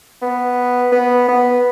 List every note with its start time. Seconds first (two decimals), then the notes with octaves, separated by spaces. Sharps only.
0.22 B3
0.92 B3
1.29 B3